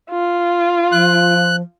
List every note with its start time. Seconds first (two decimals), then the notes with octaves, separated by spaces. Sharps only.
0.11 F4
0.92 F3 F#6